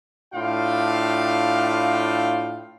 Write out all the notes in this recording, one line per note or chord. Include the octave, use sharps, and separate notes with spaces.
A2 D4 F4 F5 G5